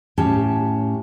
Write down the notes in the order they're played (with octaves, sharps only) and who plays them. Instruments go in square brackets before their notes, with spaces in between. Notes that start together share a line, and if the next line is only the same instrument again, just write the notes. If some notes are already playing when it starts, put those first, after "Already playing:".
[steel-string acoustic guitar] A2 C#4 G4 A5